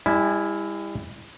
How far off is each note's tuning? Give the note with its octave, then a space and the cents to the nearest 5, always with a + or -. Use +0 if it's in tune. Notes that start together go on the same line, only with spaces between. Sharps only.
G3 +40 E4 -10 G#5 +25